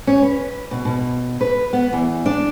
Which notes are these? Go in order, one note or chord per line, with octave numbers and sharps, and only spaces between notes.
C#4
B4
B2
B2
B4
B3
E2
D4